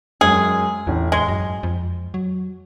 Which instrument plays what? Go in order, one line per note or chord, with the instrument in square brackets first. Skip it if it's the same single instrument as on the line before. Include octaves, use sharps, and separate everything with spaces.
[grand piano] F#2 G#3 [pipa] G#4
[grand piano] A1 E3 [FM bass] E2
[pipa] G#3 [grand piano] G7
[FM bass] F#2
F2
F#3